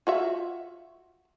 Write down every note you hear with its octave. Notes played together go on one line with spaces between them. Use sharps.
F4 F#4 E5